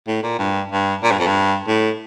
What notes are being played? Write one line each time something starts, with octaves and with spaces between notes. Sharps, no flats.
A2
A#2
G2
G2
A#2
G2
F2
G2
A2